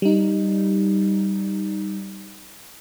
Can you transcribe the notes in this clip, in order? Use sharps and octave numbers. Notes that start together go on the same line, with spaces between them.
G3 D#4